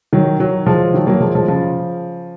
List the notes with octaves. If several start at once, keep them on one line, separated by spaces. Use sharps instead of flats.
D#3 F#3
D#3 F#3
F3 G#3
D#3 F#3
F#3 A#3
F3 G#3
F3 G#3
C#3 F3